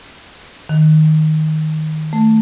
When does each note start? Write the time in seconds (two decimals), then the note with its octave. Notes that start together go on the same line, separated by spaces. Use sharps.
0.69 D#3
2.13 A3